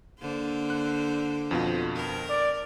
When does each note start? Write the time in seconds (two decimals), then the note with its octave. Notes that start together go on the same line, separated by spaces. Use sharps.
0.21 D3 A#3 C5
0.70 F#6
1.51 F2 B2 F4
1.96 A#4
2.29 D5